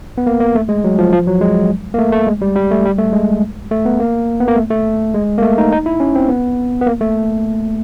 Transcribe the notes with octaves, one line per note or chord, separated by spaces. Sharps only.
B3
A#3
A#3
A3
G#3
F#3
F3
F3
F#3
G#3
A#3
A3
A3
G#3
G3
G3
A3
G3
A3
G#3
A3
B3
A#3
B3
A#3
A3
A3
G#3
A#3
A3
D#4
D#4
E4
C#4
C4
B3
B3
A#3
A3